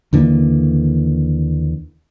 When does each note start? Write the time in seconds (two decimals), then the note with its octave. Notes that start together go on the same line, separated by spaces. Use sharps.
0.13 D#2 D3 E3 A#3